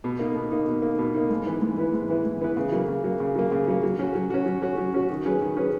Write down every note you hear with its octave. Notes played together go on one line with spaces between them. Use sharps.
B2
A#3 D#4
B2
A#3 D#4
B2
A#3 D#4
B2
A#3 D#4
G#2
E3 B3 E4 B4
G#2
E3 B3 E4 B4
G#2
E3 B3 E4 B4
G#2
E3 B3 E4 B4
C#3
F#3 A#3
C#3
F#3 A#3
C#3
F#3 A#3
C#3
F#3 A#3
F#3
C#4 F#4
F#3
C#4 F#4
F#3
C#4 F#4
F#3
C#4 F#4
D#3
F#3 C#4 G#4 B4
D#3
F#3 C#4 G#4 B4